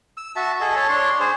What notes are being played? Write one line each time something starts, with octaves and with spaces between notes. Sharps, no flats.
E6
F#4 E5 A5
G#4 A4 D#5
A4 C#5 A5
D4 C#5 C6
G#4 C5